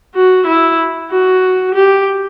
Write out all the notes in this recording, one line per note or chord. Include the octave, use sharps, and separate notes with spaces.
F#4
E4
F#4
G4